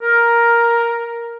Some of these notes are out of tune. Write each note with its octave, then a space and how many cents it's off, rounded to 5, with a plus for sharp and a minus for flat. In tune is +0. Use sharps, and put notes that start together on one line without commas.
A#4 +5